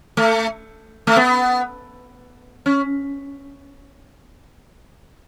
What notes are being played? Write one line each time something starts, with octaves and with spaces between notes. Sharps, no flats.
A3
A3
B3
C#4